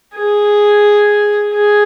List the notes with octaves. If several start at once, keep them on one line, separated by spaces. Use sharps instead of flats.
G#4
G#4